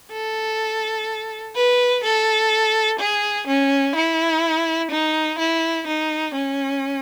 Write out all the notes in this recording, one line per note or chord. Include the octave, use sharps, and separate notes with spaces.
A4
B4
A4
G#4
C#4
E4
D#4
E4
D#4
C#4